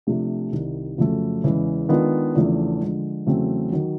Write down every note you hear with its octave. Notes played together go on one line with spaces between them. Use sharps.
C3 F3 A3 D4 G4
C2 C3 D#3 G3
F2 C#3 F#3 A3
E2 C#3 E3 G#3
D#3 G#3 B3 D4 F4
E2 C#3 F3 A3 D4
D3 F3 G#3
E2 C#3 F#3 A3 C4
D#3 F#3